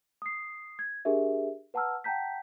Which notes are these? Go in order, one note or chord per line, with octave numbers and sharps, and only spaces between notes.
D#6 C7
G#6
D4 G4 G#4 A#4 E5
B4 F#5 A5 A#5 E6 F6
F#5 G5 A5 A#5 G6 B6